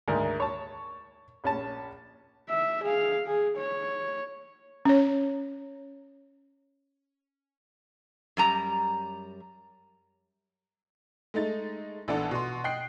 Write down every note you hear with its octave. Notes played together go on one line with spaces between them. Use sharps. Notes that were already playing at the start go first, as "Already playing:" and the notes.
D2 G#2 D#3 A#4
C#5 A5
A#1 C#4 A5
E5
G#4 F5
G#4
C#5
C#4 C#5
F#2 G3 A#5
G#3 A3 D#4 A6
A#1 E3 B3 D4 A4
B2 C6
D#5 G5 F#6 C7